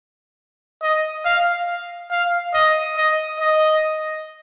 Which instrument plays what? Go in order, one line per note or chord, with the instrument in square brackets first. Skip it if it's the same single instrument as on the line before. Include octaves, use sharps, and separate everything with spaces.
[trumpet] D#5
F5
F5
D#5
D#5
D#5